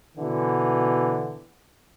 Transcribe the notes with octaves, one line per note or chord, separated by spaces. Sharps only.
B2 D3 E3